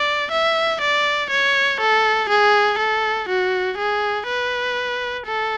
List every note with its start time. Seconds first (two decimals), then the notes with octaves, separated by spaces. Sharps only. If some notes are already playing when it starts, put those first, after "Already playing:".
Already playing: D5
0.32 E5
0.81 D5
1.31 C#5
1.80 A4
2.29 G#4
2.79 A4
3.29 F#4
3.78 G#4
4.28 B4
5.26 A4